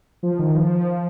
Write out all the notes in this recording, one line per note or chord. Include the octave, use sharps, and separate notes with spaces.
F3
D#3
F3